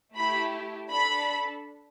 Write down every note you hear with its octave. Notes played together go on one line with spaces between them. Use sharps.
A3 E4 G4 B5
D4 A4 B5